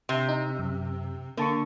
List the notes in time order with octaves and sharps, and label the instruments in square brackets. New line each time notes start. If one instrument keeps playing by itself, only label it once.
[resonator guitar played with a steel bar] C3
[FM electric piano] D#4
F#2
[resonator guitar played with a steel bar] D3 [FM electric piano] A#3 A5 C#6